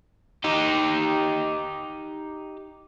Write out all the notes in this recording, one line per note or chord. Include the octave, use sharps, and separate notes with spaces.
D#4 G4